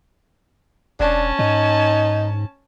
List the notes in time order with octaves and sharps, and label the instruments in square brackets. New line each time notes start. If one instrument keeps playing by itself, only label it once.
[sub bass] E1 [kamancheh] C#4 A5 [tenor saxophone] D4
[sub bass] G#2 [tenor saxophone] D#4